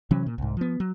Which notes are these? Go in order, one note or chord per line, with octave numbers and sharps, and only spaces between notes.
C3 E3 F#3 C#4
A#2
C2 G#2
F3 B3
F#3